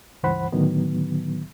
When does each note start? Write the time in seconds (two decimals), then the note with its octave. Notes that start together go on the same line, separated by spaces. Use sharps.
0.23 C#2 G2 E3 C5 F#5 B5
0.52 A2 D3 D#3 F#3 B3